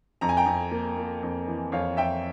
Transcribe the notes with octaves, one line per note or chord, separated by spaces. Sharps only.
F2 A#5
G#5
G5 A#5
F2
A#3
A#3
F2
E3
F2 C#5 F5
F2 E5 G5